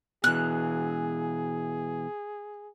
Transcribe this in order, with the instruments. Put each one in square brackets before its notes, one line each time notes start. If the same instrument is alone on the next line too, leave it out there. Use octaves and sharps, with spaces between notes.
[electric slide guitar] B2 E3 [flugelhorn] G#4 [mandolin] F#6